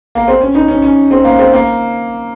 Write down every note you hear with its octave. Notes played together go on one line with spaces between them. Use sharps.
A#3
C4
C#4
D#4
C#4
C#4
C4
A#3
C4
A#3